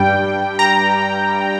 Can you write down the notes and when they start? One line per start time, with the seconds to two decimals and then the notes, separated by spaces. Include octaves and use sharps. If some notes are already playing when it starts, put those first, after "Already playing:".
Already playing: G2 G3 G5
0.59 A#5